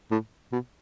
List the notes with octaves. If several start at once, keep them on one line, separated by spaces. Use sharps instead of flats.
A2
B2